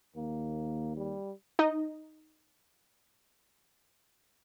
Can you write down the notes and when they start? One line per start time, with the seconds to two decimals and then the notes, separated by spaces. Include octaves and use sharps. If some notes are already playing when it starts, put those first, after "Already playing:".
0.16 D#2 A#3
0.97 G3
1.59 D#4 D#5